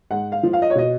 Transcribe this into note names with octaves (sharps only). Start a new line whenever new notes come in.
G#2 F#5
F5
F3
F5
D#5
C#5
B2 D#5